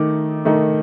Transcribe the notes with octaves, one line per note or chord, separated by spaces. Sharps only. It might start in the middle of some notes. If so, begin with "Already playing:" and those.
Already playing: D#3 A3 D#4 D6
D#3 A3 D#4